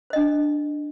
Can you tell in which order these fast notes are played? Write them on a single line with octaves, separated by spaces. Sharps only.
C5 D#5 D4